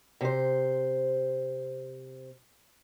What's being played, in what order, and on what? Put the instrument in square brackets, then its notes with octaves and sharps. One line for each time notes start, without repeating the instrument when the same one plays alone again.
[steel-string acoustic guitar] C3 C5